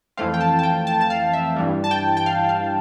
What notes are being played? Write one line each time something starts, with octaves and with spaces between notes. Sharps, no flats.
F2 E3 A3 C4 F5
G5
A5
A5
G5
A5
A5
F5
E5
G2 E3 G3
A5
G5
G5
F5
F5